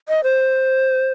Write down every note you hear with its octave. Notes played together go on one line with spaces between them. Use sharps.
D#5
C5